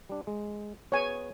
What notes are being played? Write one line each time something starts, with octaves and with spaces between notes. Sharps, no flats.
G3 D4
G#3
B3 G#4 B4 C#5 G#5